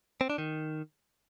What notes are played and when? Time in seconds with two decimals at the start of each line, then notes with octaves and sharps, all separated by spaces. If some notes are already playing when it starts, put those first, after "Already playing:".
0.21 C4
0.30 D4
0.38 D#3